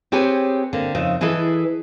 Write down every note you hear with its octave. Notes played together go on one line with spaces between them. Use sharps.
C4 G4 G#4 B4 C#5 G#5
D3 A#3 C4
F2 C#3 D#4 E5
E3 E4 G#4 A4 B4 D#5